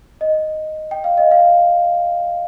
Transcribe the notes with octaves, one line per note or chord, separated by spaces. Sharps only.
D#5
G5
F5
D#5
F5